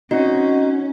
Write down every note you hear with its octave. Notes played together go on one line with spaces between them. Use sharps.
C4 C#4 D#4 F#4